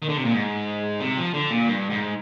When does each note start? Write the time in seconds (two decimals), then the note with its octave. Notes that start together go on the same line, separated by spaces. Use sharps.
0.02 D#3
0.09 D3
0.17 C3
0.25 A#2
0.32 G#2
1.00 C3
1.17 F3
1.34 D3
1.50 A#2
1.67 G2
1.90 G#2